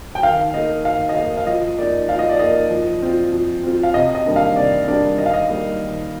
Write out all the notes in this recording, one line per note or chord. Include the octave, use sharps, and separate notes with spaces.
G5
D#3 F5
A#3 D#4 D#5
D#3 F5
D#5
A#3 D#4 F5
F5
F3 D#5
A#3 D#4 D5
F3 F5
D#5
D5
A#3 D#4 D#5
F3
C4 F4
F3
C4 F4
F5
C3 D#5
D#5
D#3 G3 A#3 D4
F5
C3 D5
D#3 G3 A#3 D4 D5
D#3 D#5
F5
D#5
G3 A#3 D#4
D#3